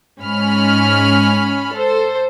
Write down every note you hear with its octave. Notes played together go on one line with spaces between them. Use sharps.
G#2 C#4 B5 F6
A4 C5